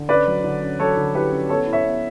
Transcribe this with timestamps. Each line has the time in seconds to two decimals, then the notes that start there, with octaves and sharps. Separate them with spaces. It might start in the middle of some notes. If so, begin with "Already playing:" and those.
Already playing: D3
0.09 C#4 B4 D5
0.27 F#3
0.44 D3
0.62 C#4
0.79 F#3 A4 C#5
0.97 D3
1.14 E4 G4 B4
1.32 C#4
1.49 B3 A4 C#5
1.67 E4
1.73 C#5 E5
1.85 B3